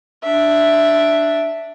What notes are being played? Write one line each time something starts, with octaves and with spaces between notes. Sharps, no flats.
D4 E5